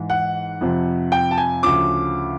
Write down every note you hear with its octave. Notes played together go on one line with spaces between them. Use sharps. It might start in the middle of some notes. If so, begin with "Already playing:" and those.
Already playing: G#2 E3
F#5
F2 C3 F3
G5
A5
G#5
D2 C#3 F3 D6